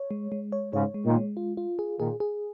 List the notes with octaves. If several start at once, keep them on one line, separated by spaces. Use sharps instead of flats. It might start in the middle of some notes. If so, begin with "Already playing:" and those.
Already playing: C#5
G#3
G#3
C#5
G#2 C#3 C#5
G#3
A#2 D#3
G#3
F4
F4
G#4
A#2 D#3 G#4
G#4